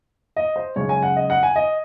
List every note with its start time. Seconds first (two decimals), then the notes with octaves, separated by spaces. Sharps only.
0.36 D#5
0.56 C5
0.76 F#2 C#3 G#3 C#5
0.89 G#5
1.03 F#5
1.16 D#5
1.30 F#5
1.43 G#5
1.56 D#5